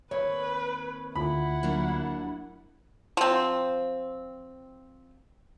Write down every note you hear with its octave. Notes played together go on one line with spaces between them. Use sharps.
D#2 C4 B4 C#5
D2 D3 E4 F4 F#5 B5
F#3 A#3 D4
F3 C4